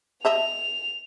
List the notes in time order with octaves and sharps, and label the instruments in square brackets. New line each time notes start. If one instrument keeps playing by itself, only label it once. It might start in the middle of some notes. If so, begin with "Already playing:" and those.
[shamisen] D#5 E5 A5 [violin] F7